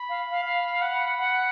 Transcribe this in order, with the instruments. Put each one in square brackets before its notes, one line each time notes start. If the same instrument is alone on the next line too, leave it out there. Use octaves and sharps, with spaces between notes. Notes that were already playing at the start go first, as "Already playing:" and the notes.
Already playing: [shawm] B5
[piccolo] F5
F5
F5
[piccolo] F#5 [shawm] B5
[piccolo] F#5